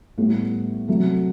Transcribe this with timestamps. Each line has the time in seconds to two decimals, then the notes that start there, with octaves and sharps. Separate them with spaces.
0.18 A2 G3 B3
0.88 C3 F#3 A3